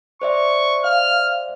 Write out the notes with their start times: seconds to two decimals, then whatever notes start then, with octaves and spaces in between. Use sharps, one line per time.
0.22 C5 D5 E5 C#6
0.84 F5 F6